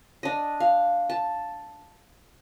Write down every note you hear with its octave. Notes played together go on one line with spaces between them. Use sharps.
D4 D#5
F5
A5